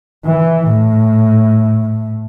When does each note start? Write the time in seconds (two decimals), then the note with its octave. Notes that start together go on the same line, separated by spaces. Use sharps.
0.25 E3
0.67 A2